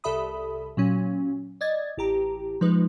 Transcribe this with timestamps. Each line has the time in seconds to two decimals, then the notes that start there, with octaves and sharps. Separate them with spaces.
0.04 C2 A4 E5 B5 D#6
0.77 A#2 F#3 C#4
1.61 D5 D#5 G#6 A6
1.98 A1 G4 A#5
2.61 F3 G#3 D#4 B4